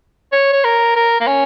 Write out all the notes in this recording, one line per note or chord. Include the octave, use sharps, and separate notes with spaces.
C#5
C#5
A#4
A#4
A#3
C#4